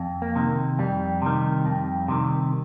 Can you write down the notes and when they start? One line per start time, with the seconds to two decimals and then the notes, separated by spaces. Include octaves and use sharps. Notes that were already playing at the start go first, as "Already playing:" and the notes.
Already playing: F2
0.22 A#3
0.35 C3 D#3
0.79 F2 G3
1.22 C3 D#3
1.66 F2
2.08 C3 D#3